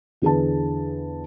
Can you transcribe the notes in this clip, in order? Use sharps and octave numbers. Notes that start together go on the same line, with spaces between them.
E2 D3 G#4 B4 A5